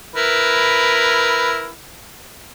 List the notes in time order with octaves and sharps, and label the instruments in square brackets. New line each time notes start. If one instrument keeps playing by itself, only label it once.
[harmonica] E4 A#4 B4